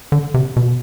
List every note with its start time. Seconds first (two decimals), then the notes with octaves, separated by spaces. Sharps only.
0.12 D3
0.34 C3
0.56 B2